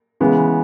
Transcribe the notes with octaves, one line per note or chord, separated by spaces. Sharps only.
C#3 E3 G#3 B3